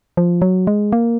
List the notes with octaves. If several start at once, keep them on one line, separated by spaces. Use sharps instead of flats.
F3
F#3
G#3
A#3